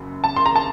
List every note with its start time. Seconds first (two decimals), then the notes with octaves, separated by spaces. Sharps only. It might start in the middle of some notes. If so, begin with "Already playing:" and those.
Already playing: F#1 F#2
0.24 A5
0.36 C6
0.46 A#5
0.56 A5